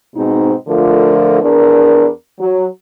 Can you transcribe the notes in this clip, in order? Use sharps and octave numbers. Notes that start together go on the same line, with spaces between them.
G#2 B2 C4 D#4
D3 F3 A3 F4 A#4
E2 D4 A#4
F#3